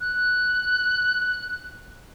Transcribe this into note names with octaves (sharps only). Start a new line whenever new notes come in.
F#6